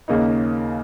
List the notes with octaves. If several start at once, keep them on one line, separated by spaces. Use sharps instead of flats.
D#2 C#3 A#3 D#4